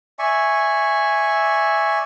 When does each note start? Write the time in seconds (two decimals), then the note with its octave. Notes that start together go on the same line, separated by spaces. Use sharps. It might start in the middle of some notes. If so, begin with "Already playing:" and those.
0.19 D5 E5 G#5 C#6